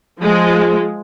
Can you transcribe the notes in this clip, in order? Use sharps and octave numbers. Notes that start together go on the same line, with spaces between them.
F3 G#3